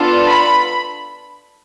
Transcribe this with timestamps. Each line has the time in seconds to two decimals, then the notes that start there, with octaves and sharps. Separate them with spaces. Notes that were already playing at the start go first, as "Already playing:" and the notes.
Already playing: B3 D4 F4 A4
0.28 B5